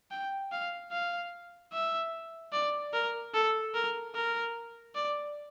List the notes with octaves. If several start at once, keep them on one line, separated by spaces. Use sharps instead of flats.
G5
F5
F5
E5
D5
A#4
A4
A#4
A#4
D5